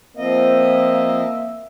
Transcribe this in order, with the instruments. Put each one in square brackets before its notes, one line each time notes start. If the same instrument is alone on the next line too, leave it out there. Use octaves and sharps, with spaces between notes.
[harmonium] F3 C4 D#5 [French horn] A#3 [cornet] E5